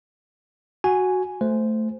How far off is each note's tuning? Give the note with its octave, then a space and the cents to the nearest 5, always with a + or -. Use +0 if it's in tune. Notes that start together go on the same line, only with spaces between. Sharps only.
F#4 +0 G#5 +0
A3 +0 C5 -10